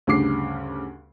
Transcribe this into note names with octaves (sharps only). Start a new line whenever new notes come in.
D2 G2 C#3 D6 C7